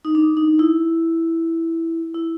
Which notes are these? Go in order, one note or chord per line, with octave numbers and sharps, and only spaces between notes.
D#4
D4
D#4
E4
E4